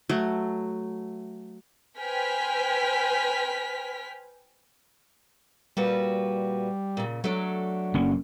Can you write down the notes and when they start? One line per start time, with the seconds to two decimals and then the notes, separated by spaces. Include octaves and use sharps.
0.09 F#3 A3
1.99 B4 C5 G5 G#5 F6 B6
5.77 A#2 G3 F#4 B4
6.97 A#2 C#3
7.24 F#3 A3 D4
7.94 F#1 A#3 C#4